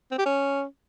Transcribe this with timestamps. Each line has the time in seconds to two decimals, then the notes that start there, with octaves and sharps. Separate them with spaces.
0.11 C4
0.18 G4
0.26 C#4